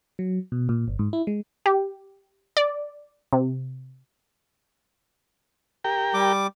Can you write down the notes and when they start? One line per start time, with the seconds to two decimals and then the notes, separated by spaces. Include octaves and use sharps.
0.19 F#3
0.52 B2
0.69 A#2
0.88 G1
0.99 G#2
1.13 E4
1.27 G#3
1.66 G4
2.57 D5
3.33 C3
5.84 G4 A#4 G5
6.14 G3 D6